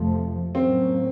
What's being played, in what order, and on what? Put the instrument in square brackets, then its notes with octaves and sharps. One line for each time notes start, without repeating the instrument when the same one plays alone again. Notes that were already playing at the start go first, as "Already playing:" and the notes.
Already playing: [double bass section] F2 C3 F3 A3
[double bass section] A2 F#3 A#3 C#4 [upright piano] C4